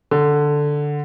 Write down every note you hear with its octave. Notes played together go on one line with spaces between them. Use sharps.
D3